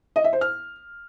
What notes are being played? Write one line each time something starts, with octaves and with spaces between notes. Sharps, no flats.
D#5
E5
C5
F6